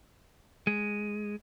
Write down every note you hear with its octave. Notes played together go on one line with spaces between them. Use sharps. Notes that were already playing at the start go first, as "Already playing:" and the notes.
G#3